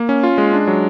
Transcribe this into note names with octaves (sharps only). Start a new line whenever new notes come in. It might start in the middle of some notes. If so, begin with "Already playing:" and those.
Already playing: A#3
C#4
F4
G#3
D4
F#3